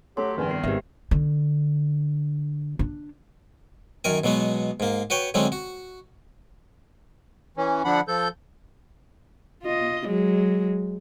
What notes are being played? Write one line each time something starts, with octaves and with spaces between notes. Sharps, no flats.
F#3 A3 G4 A4 C6
F1 E2 G2 D#3 G#5
B3 A#4 C7
G#1 G#3 G4 B4 C5 E5
D3
D4
F#2 D#3 A#4 G#5
B2 F#3 G#3 B3
G#2 A#3
F#4 B4 C#5 G5
D3 F#3 G#3 C4 C#4
F#4
E3 C#4
D3 F3 D4 F#5 B5
F3 A4 G6
F4 D#5
F#3 G#3